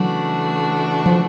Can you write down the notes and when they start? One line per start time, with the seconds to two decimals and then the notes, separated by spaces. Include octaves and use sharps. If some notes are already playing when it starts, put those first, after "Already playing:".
Already playing: C#3 E3 F#3 A3 D4 F#4
1.06 F3